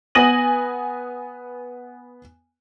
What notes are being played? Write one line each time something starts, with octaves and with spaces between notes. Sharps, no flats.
B3 G#5 D#6 A#6 D#7 F#7